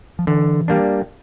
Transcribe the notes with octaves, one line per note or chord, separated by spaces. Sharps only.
F3
D3 E3
G3 A#3 D4